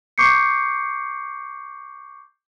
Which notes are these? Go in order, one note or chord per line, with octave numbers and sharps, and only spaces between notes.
C#6 D6 G6 C7 C#7